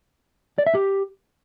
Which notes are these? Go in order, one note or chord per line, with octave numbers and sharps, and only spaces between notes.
D5
E5
G4